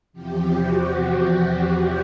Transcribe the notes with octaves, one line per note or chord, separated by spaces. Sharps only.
E2 C3 F3 G4
F#4
G4